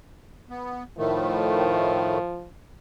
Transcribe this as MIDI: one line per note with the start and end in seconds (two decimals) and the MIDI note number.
0.50 0.83 59
0.98 2.18 45
0.98 2.18 51
0.98 2.48 53
0.98 2.18 57